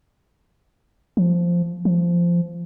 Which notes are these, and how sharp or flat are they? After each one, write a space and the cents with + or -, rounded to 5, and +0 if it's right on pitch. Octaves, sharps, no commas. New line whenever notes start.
F3 -5
F3 -15